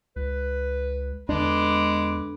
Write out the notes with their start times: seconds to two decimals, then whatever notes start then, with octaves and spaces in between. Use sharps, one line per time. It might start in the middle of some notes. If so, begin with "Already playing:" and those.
0.16 C#2 B4
1.29 E2 D3 G#3 D4 B4 D6